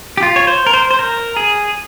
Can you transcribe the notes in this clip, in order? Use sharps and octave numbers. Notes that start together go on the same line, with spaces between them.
G4
F4
C#5
C5
A#4
C5
C5
A#4
G#4